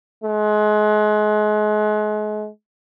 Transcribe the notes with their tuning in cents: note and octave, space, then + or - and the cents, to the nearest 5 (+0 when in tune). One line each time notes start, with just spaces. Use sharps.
G#3 +35